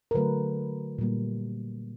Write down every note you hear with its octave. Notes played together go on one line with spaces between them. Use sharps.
A#4
D3 F#3 A3 B4
A#2 G3 A#3